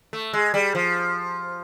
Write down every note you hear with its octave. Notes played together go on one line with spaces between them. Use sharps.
A3
G#3
G3
F3